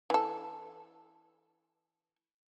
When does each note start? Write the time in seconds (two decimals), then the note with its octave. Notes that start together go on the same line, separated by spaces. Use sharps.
0.10 E3 A4